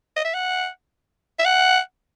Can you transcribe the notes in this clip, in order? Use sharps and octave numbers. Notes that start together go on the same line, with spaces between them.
D#5
E5
F#5
E5
F#5